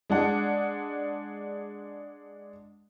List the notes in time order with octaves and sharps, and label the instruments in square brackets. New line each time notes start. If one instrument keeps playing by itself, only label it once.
[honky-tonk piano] G#3 D4 F#5